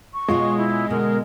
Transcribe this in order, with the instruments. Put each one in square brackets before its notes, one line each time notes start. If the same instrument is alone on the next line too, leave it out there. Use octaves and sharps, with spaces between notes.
[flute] C#6
[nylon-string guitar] B2 F4 C#5 [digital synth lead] G#3
[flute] E4
[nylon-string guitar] B2 D3 [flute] A#4